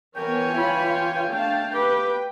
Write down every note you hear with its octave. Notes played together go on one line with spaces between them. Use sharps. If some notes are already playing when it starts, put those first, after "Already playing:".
E3 B3 A#4 C#5 G5 G#5
F4 B5
F4
A3 D4 F5 A5
G4 B4 G5